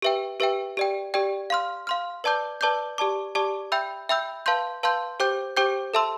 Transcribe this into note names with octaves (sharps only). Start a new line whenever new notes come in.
G4 B4 E5 G5
G4 B4 E5 G5
G4 D5 G5
G4 D5 G5
F5 C6 F6
F5 C6 F6
B4 D5 A5 D6 G6
B4 D5 A5 D6 G6
G4 D5 A5 D6
G4 D5 A5 D6
E5 G5 B5 E6 G6
E5 G5 B5 E6 G6
B4 F5 A5 C6 G6
B4 F5 A5 C6 G6
G4 C5 G5 D6 G6
G4 C5 G5 D6 G6
A4 E5 A5 C6 E6